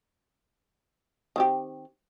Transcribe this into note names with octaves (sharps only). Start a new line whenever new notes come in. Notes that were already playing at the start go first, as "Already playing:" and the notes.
D#3 C4 G4